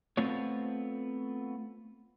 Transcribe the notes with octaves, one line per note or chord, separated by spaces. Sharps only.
A3 B3 C4 F4 C#5